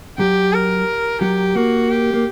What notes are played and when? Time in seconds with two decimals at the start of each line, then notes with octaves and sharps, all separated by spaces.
0.19 F#3 G4
0.53 A#4
1.21 F#3 G4
1.55 A#3 F#4
1.90 G4
2.14 A#3